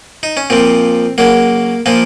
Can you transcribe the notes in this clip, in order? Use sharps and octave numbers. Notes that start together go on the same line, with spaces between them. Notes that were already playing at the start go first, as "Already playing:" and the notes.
D#4
C#4
A#2 F3 C4
C#3 F#3 A#3
A#2 F3 A#3